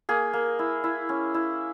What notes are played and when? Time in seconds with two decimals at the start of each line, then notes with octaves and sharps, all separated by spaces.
0.09 A#3 G#4
0.33 A#3
0.59 E4
0.84 E4
1.09 C#4
1.34 E4